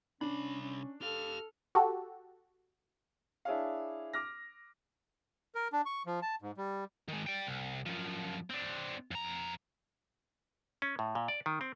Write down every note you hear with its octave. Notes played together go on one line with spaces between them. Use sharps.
C2 C#4 D4 B5
C#4
G4 A4 F5 F6
F#4 G4 A4
D4 E4 G#4 C#5 F5
D6 F6 A#6
A#4
D4
C#6
F3
A5
G#2
G3
D#3 G#3
D5 G5
C2
F#2 F3
C4 D4
F2 A#5
C#4
A2
A#2
D5
D#3
C4